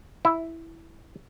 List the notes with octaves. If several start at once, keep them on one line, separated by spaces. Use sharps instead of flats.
E4